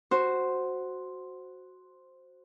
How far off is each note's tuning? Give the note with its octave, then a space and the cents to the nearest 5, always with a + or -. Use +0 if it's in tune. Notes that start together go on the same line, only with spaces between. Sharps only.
F#4 +0 C5 +0